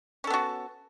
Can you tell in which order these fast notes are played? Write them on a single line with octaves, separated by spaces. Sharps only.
C#4 A4 B3 F#4